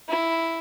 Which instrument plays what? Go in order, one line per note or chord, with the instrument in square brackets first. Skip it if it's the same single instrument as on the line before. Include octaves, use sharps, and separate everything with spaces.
[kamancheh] E4